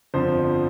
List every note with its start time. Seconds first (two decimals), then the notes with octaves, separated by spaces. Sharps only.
0.14 G1 F2 F3 C5